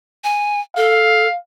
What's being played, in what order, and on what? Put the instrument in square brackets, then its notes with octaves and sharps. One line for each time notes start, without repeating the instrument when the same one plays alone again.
[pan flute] G#5
[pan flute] A4 [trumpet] F5